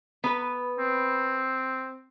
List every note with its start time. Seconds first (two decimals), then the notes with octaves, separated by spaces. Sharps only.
0.24 B3 B4
0.79 C4